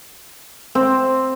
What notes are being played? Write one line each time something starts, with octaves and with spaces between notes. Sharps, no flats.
C4